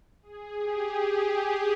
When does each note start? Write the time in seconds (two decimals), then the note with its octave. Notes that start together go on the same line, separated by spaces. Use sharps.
0.22 G#4
0.58 G4
0.93 G#4